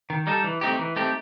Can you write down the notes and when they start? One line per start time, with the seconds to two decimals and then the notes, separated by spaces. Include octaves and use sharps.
0.10 D#3
0.27 G3 D#4 A4
0.44 E3
0.61 A3 C4 D#4 G4
0.79 E3
0.96 A3 C4 D#4 G4